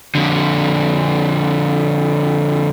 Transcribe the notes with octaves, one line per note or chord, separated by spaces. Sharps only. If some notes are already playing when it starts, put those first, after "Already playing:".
F2 D3